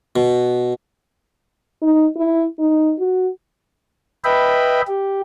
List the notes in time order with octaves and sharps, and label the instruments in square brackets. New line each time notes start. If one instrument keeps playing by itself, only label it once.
[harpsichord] B2
[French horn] D#4
E4
D#4
F#4
[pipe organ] B4 D#5 E5 G5 B5
G4